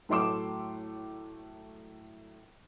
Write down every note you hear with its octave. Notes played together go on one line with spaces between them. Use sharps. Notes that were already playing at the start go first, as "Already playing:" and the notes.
A2 F#3 A3 C6 D6 E7